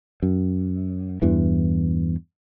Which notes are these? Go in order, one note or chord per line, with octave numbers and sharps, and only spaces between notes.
F#2
E2 G2 E3